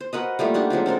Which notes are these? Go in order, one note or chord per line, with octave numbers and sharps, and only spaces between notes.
C5
F#4 A#4 B4 D#5
G3 A3 A#3 F4
D4 D#4 F#4 G4
F#3 G#3 C4 F4
C4 A4 A#4 C5